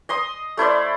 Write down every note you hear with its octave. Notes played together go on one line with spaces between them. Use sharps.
D#5 C6 D#6
A3 E4 C5 D5